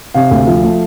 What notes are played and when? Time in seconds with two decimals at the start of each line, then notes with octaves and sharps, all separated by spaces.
0.14 C3 F5
0.31 D2
0.47 F3
0.63 A3